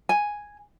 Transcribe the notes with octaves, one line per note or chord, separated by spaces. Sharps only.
G#5